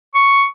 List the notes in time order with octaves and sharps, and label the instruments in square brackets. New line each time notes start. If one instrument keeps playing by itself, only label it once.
[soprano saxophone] C#6